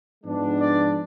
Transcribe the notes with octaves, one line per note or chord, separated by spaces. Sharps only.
G#2 F3 G#3 B3 D4
D5